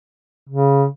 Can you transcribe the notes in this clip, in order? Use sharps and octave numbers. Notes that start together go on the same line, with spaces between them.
C#3